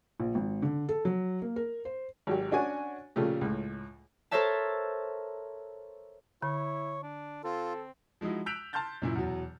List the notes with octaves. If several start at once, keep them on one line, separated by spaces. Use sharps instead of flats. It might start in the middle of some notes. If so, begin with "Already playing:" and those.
A#1
G#1
D3
A4
F#3
A#3
A#4
C5
G#1 F#3 G4
C#4 D4 F#4 G#5
A#2 C#3 F3 A3 G4
C#2 A2
A4 A#4 C5 C#5 E5 A5
D3 E4 C#5
D4
C4 F4 A4
F3 G#3 D#4 E4 F#4
E6 F#6 G6 B6 D7 F7
A5 C6 F6 G6 A6
F#2 A#2 E4
E2 B2 F#3